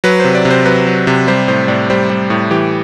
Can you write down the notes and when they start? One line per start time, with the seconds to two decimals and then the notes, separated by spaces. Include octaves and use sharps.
0.04 F#3 B4
0.20 C3 C5
0.35 D5
0.45 C3
0.50 C5
0.65 F#3 B4
0.87 F#3
1.07 C3
1.27 G3 C5
1.48 A2 C5
1.68 A2 D5
1.90 G3 C5
2.10 G3
2.30 A2
2.51 E3 G4